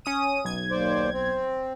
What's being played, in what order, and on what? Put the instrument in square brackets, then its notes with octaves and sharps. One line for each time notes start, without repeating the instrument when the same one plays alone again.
[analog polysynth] C#4 D#6 D#7
B1 G#6
[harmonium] D#2 C5 D5
C4